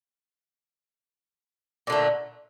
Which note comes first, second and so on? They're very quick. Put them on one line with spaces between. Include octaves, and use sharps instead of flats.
A#2 D3 A3